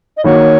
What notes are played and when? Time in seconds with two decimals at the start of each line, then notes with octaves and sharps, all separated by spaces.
0.17 D#5
0.24 D#3 A#3 F#4 C#5